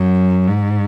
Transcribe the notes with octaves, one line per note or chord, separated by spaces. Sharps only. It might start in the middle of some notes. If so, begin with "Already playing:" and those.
Already playing: F#2
G#2